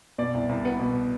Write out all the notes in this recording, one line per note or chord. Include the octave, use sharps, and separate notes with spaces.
B2 D5
C2
C2
B3
B2